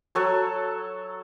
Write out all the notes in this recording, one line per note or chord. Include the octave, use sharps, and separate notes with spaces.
F#3 A4 C#5